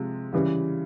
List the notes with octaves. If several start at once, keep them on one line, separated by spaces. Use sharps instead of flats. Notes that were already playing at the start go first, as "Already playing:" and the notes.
Already playing: C3 F3 G#3
C#3 E3 G3